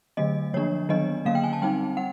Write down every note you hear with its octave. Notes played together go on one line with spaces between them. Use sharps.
D3 F#3 A3 D#5
D3 F3 A#3 D4 C#5
D#3 F#3 B3 D4 D#5
D3 F#3 A#3 C#4 F5
G5
G#5
A5
G3 C4 D#4 G5
G3 F#5